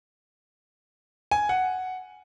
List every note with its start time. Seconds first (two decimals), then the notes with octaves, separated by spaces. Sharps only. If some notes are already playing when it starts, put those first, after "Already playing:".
1.31 G#5
1.49 F#5